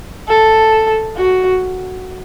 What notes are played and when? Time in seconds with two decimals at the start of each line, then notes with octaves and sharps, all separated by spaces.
0.28 A4
1.16 F#4